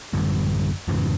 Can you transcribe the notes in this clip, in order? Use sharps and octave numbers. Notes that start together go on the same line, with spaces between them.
A1 F#2 D3 G3
F2 G#2 C#3 E3